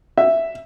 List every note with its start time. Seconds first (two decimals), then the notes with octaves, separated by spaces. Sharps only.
0.18 E5